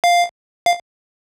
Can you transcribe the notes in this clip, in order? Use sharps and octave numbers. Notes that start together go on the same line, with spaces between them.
F5
F5